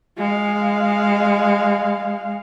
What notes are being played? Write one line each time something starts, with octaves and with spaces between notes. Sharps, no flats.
G#3 F5